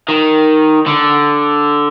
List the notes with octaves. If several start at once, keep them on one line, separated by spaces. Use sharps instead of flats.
D#3
D3